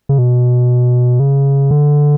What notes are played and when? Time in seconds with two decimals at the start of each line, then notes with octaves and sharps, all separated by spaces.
0.09 C#3
0.18 B2
1.20 C#3
1.71 D3